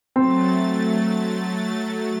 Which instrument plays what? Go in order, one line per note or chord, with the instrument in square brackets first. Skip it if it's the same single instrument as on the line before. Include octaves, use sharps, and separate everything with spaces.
[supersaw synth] F#3 A3 A6 [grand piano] C4